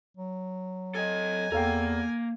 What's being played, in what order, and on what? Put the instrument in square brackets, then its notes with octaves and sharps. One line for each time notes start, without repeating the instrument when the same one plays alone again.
[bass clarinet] F#3
[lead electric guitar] A4 D#5 [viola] G#5
[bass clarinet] E2 [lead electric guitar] A#3 A#5 [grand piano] A4 F5 G5